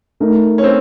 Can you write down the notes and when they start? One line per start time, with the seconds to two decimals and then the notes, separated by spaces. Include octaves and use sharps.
0.20 A3 D#4 A#4
0.58 C#4
0.64 C4